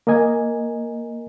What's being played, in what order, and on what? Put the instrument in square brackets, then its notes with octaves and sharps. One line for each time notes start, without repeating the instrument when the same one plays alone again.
[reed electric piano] A#3 A#4 D#5 G#5